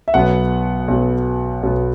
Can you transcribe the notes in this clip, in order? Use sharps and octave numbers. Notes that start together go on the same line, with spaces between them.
E5
B1 B2 F#3 B3 F#5
B1 B2 F#3 B3
B1 B2 F#3 B3